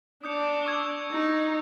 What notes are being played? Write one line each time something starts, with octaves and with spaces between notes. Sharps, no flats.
D4 D#6 G6 C#7
C#6 E6 G#6
D#4